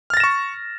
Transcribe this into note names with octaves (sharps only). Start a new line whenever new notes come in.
C#6 F6 A6 A#6 E7